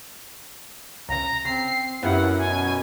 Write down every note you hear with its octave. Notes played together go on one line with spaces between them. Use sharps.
C#2 C#3 A#5
C#3 C4 C7
F#2 B3 E4 F4 G4 F#5
B2 G#5